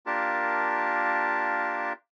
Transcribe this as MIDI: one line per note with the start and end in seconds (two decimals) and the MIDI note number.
0.06 1.93 58
0.06 1.93 62
0.06 1.93 65
0.06 1.93 67
0.06 1.93 70
0.06 1.93 81